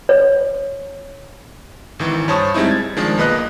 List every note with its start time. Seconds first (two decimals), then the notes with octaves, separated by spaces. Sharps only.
0.09 C#5
1.99 G#1 D#3 E3
2.28 G2 C5 C#5 A5 C#6 D#6
2.54 G3 G#3 C4 D#4 E4
2.69 G#6 A6
2.97 D#3 F3 G#3 D4
3.17 B1 A#3 B4 D#5 F#6